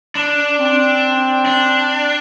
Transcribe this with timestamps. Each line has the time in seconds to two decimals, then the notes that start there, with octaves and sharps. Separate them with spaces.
0.15 D4
0.59 C4
1.46 D4